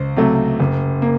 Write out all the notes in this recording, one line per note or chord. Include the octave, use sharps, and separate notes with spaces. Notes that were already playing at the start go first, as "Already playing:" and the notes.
Already playing: C#2 C5
C3 F#3 A3
F#1
A#3